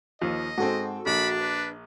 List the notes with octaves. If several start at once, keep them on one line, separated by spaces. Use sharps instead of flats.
D#2 F3 D#5
G#2 C4 F#4 A4
A#1 D4 B5
B4